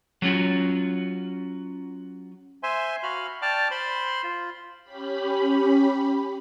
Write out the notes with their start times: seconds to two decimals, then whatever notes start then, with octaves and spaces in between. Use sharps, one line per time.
0.22 F#3 C#4 F4 F#4
2.63 C5 E5 G#5 C6
3.03 F#4 F5 B5 F6
3.42 D5 G5 A5 D6 F6
3.71 C5 B5 C6
4.23 F4
4.82 C#4 G4 B5